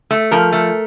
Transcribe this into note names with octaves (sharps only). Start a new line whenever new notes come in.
A3
F3 A#4
A3